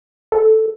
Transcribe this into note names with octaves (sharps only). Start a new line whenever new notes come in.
A4